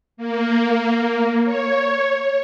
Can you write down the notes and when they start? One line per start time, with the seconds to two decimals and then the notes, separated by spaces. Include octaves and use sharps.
0.17 A#3
1.45 C#5